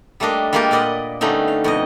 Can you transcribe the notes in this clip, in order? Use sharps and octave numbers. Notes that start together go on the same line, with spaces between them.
G3 A3 A#3 D4 D#5
G3 G#3 A#3 F4 G4 A#4
A#2 B4 D5 D#5 F#5
D3 G3 A3 B3 C#4 D#4
F5
F2 B2 D#5